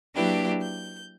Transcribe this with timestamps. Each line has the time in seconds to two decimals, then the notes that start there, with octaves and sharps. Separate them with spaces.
0.15 F#3 A#3 D4 E4 G4 B4
0.61 G6